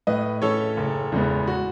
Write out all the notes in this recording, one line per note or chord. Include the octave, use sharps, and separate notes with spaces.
A2 B4 D#5
E3 A3 C#4 A4 C#5
F#1
E2 C#3 G#3 B3
F#4